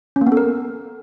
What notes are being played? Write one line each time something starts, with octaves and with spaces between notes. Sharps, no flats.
C#4
A#3
B3
A4
A#4